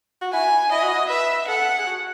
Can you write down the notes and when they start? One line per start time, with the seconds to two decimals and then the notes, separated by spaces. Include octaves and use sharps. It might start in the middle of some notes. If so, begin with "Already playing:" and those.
0.21 F#4
0.33 E4 G#5
0.71 E4 D#5
0.83 F#4
0.94 E4
1.09 B4 E5
1.47 A4 F#5
1.78 G#4
1.86 F#4